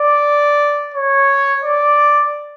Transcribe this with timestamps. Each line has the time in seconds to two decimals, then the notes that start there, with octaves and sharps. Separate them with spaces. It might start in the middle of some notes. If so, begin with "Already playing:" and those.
Already playing: D5
0.95 C#5
1.64 D5